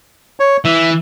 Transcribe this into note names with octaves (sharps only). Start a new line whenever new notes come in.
C#5
E3 E5